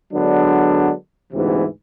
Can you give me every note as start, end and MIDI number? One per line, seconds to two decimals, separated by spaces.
0.14 0.92 50
0.14 0.92 54
0.14 0.92 56
0.14 0.92 59
0.14 0.92 62
1.33 1.64 38
1.33 1.64 44
1.33 1.64 48
1.33 1.64 52
1.33 1.64 59